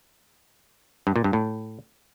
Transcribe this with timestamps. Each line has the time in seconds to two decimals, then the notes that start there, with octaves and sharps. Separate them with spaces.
1.07 G2
1.16 A#2
1.24 G2
1.33 A2